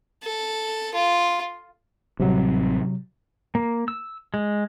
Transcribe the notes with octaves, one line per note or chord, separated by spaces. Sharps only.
A4
F4
A1 C3 F#3 G3 C4
A#3
E6
G#3